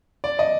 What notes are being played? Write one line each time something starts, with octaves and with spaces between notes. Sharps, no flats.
D5
D#5